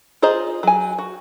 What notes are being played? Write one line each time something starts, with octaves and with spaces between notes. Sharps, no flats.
F4 G#4 C5 D#5 A#5
F#3 G#5
F#4